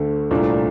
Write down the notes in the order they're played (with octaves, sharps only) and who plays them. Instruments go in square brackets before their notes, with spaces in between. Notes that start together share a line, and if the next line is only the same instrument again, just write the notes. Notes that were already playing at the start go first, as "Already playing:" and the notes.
Already playing: [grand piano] D2 D3 A3
C2 A#2 A3 D4